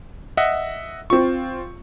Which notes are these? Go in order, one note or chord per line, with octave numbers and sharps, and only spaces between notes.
D#5 E5 F#5
C4 F4 C#6